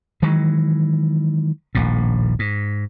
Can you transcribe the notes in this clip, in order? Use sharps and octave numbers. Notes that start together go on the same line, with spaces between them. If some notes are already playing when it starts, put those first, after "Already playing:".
D#3 E3 F#3 G#3
D#1 A#1 A2
G#2